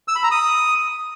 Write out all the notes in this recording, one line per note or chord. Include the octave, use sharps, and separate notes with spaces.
E6
B5
A#5
D#6